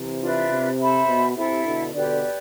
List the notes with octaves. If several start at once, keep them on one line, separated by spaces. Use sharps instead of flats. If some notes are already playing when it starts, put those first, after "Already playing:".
Already playing: C3 E3
D4 F4 B4 E5
C3
A4 C5 E5 B5
B2
C3 E4 A4 E5
B2 D3
B2 D3 G4 B4 D5